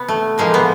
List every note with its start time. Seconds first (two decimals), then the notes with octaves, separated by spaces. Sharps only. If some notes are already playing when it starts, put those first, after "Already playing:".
Already playing: C3 B3
0.08 A3
0.38 A2 F3 G#3 A#3
0.54 B3